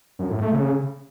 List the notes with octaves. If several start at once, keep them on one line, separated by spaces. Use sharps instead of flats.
F#2
A2
A3
C#3